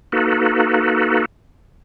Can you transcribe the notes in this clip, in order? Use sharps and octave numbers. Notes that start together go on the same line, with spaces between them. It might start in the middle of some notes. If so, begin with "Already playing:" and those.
A#3 D#4 F#4 A4 B4